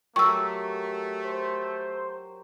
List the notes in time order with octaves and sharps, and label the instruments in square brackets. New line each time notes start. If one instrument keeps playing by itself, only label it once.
[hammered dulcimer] F#3 G4 A#4 [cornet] A3 [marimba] C#6 E6
[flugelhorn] C5